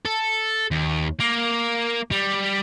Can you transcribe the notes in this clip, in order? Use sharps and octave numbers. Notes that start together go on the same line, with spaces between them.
A4
D#2
A#3
G3